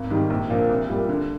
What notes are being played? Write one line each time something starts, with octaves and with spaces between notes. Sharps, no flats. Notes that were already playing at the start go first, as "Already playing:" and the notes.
Already playing: G#1
G#2 D#3 G3
A#1
A#2 F3 A#3 D4
C2
A#2 G3
D3